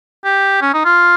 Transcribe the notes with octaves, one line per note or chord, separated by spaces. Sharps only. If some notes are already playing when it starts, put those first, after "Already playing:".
G4
C#4
D#4
F4